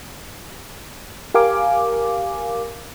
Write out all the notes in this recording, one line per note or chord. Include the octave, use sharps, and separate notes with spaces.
G4 A#4 F5 G#5 D6